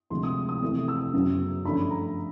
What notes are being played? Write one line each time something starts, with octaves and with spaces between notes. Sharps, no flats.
D2 C3 F3 G#3 C6
D#6
D#6
F2 C3 E3 A3 C4
E6
F#2 C#3 F#3 B3
G2 D3 F3 A3 C#4 B5
A#5